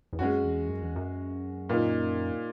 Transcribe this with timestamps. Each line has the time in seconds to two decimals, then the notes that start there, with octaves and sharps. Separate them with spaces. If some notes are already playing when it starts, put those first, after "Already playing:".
0.13 E2
0.19 F#2 G#3 C#4 F#4
0.44 E2
0.68 F#2
0.82 E2
0.96 F#2
1.69 A#2 A#3 D#4